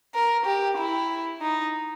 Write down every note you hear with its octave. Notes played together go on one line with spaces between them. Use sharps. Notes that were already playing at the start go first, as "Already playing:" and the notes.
A#4
G4
E4
D#4